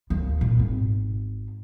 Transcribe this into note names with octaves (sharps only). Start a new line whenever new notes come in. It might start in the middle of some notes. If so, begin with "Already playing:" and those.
D#2
A#2
G#1